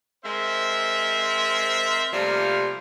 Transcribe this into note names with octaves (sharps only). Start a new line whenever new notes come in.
G#3 C4 A#4 C5 E5
C3 F3 G3 A3 A#3